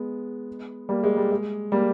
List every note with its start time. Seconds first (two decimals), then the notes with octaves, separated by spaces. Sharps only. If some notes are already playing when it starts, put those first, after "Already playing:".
Already playing: G#3 B3
0.89 G3 A#3
1.03 G#3
1.17 G3
1.31 G#3
1.72 G3 A#3